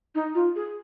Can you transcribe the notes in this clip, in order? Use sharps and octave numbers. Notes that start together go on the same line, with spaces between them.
D#4
F4
G#4